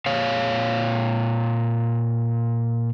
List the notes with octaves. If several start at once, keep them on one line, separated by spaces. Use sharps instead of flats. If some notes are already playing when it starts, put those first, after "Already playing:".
A#2 C#5 F5